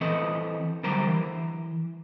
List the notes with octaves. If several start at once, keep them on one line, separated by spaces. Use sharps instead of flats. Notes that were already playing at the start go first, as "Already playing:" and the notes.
E3 C4 A4 B4 D#5
D3 F#3 G3 A#4 C5 A#5
E3